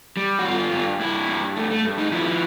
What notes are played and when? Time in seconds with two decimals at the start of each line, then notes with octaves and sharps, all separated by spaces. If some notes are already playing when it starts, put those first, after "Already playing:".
0.17 G3
0.39 F#4
0.45 G2 F4
0.72 G2
1.00 G2 E4
1.29 G2
1.56 A3
1.71 A3
1.85 G2
1.98 D#4
2.12 F3 E4